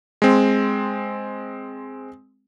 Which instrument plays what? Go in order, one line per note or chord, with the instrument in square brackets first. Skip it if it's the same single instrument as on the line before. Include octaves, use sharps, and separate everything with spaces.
[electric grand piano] G#3 C4